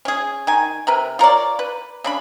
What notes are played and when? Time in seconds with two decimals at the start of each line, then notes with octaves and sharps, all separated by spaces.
0.05 C#4 G#4
0.47 D#3 G#5
0.87 C3 A#4 B4
1.19 F4 A#4 C#5 D5
1.59 B4
2.04 C#3 D4 B5